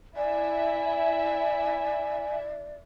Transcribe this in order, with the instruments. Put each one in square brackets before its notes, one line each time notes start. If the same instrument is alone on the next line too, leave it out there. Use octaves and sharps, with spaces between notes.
[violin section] E4 E5 [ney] D5 [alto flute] G#5